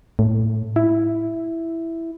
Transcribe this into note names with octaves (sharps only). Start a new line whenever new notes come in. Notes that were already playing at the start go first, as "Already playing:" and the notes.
A2
E4